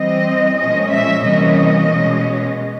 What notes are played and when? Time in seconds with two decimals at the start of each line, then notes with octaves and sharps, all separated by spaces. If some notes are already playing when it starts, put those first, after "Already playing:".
Already playing: E3 G3 C4 D#5
0.58 A#2 F3 G#3 C#4 D#5
0.91 E5
1.24 C3 E3 G3 A#3 C#4 D#5
1.89 B2 G#3 C#4